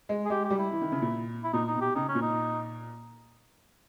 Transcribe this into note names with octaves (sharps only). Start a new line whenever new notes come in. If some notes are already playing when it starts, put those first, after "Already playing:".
G#3
G#4
G#3 G4
G4
G3
E4
E3
D#3
C#3
A#2
E4
A#2 D#4
D#4
B2
G4
C#3 D#4
C#4
A#2
D#4